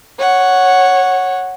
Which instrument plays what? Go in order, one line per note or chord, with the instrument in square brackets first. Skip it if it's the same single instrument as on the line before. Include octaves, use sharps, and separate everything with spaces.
[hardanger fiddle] C#5 F#5